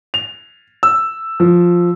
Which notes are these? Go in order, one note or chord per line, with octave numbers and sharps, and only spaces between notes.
F7
E6
F3